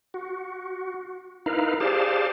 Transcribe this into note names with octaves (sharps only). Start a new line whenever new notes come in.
F#4
D#4 E4 A#4 B4 F5
G4 G#4 C5 D5 F5 A5